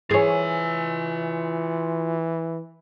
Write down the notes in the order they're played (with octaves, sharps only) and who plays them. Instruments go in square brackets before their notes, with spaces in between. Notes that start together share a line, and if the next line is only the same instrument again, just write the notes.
[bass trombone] E3 [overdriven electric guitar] F4 G#5 [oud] G#4 C#5